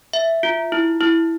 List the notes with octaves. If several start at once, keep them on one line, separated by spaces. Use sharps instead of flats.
E5
F4
E4
E4